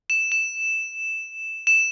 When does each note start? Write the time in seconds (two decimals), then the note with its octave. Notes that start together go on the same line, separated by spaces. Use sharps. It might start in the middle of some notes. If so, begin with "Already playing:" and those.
0.10 E7
0.32 E7
1.67 E7